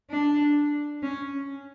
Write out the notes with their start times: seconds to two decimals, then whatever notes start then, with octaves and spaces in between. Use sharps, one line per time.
0.10 D4
1.03 C#4